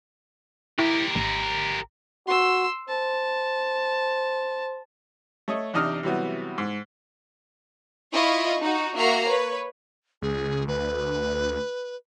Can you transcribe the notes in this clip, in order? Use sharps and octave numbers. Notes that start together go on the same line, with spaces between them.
E4 G4 A#4
G#1
F#4 C6 E6
C5 A5
A3 C#5 D#5
E2 C3 D4 D#4 D#5 F6
C3 E3 F#3 G3 B3
G#2
E4 F4 D#5 B5 C#6
D#4 F#4
A#3 F#4 E5 A#5 C7
B4 C#5
C#2 G#4
D2 B4